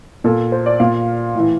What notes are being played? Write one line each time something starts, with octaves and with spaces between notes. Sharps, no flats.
A#2 A4
C5
D5
A#2 F5
A2 E3